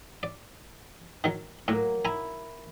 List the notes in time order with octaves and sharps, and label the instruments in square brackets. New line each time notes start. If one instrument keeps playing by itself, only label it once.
[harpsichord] D5
D#3 F#3
[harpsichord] A2 [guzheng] F#3 A#3
[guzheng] E4 [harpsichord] G#5 A#5